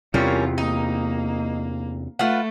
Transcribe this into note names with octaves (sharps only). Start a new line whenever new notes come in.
E2 C3 G3 C#4 F4 A#4
A#3 D#4
A3 F4 B4 F#5